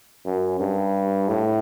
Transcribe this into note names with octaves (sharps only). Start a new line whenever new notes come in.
F#2
G2
A2